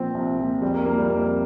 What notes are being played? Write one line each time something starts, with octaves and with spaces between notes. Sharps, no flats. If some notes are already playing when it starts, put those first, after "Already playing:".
Already playing: A#2 F3 C4
C2
A#2 F3
F2 G3
A#3
F3 A#3
G3
F2 A#3